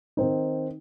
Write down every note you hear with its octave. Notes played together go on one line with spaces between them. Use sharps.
D#3 C4 D#4